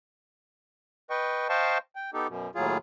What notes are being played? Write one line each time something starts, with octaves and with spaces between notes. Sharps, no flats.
B4 D#5 G5 C#6
C5 D#5 F5 G5 A5 C#6
G5
B3 D#4 G4 A4
F#2 B2
D#2 A2 F#3 F4 G#4